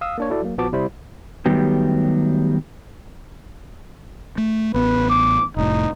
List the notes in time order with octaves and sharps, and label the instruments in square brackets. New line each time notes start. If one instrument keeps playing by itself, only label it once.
[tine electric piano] F5 D#6 E6
A#3 D4 C#5
E4 F#4 A4 D5
F#3 A#3
A#1 F3 B3 F#4 A5 D6
C3 G3 E4 C5 B5
[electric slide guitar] D#3 F#3 G3 A3 B3 G4
[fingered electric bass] A3
[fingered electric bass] A1 B3 [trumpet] B4
[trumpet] D6
[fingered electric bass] F1 A2 [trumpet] D#4